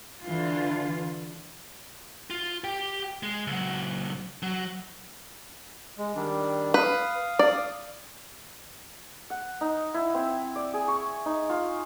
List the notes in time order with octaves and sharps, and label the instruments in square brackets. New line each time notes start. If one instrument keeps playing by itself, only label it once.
[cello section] D3 E3 F4
[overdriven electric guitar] F4
G4 G5
G#3
C#2 F#3
F#3
[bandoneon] G#3
D#3 G3 D4
[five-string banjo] B4 [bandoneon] F5 D#6
[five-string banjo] D5
[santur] F#5
D#4
E4
C4
D5
G#4
C#6
D#4
F4